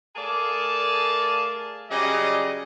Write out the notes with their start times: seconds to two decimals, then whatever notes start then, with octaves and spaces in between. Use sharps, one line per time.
0.16 A3 G#4 A#4 D5 F5 A5
1.90 C#3 F#3 G3 D5 D#5